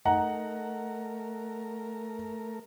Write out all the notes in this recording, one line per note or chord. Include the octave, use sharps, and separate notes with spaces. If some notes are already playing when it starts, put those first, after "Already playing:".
A3 D#4 A#4 F#5 A#5